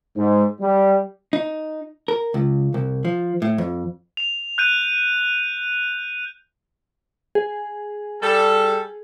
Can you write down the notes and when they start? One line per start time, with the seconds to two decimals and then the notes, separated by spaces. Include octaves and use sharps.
0.16 G#2
0.61 G3
1.33 D#4
2.08 A#4
2.34 C#2
2.74 C2
3.05 F3
3.42 A2
3.58 F2
4.17 F7
4.58 F#6 G6 D#7
7.35 G#4
8.22 G3 A4